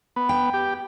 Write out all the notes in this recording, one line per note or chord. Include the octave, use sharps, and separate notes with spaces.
B3
G5
G4